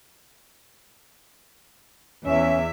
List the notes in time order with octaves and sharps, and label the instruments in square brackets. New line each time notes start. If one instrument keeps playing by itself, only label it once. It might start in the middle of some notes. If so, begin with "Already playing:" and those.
[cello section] E2 E5 [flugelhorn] C#4